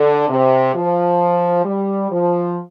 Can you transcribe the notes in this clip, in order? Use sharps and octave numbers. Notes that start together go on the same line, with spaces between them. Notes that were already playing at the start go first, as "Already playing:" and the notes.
Already playing: D3
C3
F3
G3
F3